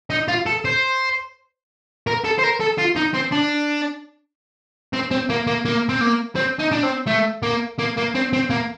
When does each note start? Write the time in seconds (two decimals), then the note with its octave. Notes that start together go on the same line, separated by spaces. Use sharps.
0.10 D#4
0.28 F4
0.46 A4
0.65 C5
2.07 A#4
2.25 A4
2.39 C5
2.44 A#4
2.61 A4
2.78 F4
2.96 D#4
3.14 C4
3.32 D4
4.93 C4
5.11 C4
5.30 A#3
5.47 A#3
5.65 A#3
5.89 C4
6.01 A#3
6.36 C4
6.59 D#4
6.72 D4
6.83 C4
7.07 A3
7.43 A#3
7.79 A#3
7.97 A#3
8.15 C4
8.33 C4
8.50 A#3